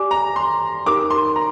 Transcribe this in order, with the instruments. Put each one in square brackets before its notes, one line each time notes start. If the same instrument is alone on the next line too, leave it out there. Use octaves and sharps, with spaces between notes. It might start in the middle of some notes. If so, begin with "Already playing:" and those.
Already playing: [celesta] G4 D5 G#5 D6
[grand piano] A#5
C6
[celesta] D#4 G4 A#4 [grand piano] D6
[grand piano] C6
A#5